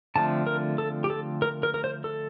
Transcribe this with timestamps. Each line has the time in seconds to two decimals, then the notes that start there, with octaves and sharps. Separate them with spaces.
0.16 D3 F3 A3 C4 A5
0.47 A#4
0.78 A4
1.04 G4
1.10 A4
1.42 A#4
1.63 A#4
1.74 A#4
1.84 C5
2.04 A4